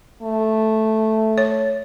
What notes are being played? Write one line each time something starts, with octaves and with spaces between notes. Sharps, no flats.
A3
C#5